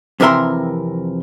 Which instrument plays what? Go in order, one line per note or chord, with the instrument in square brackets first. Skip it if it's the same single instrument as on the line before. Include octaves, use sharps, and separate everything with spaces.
[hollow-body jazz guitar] F2 C3 E3 A#4 E5 C6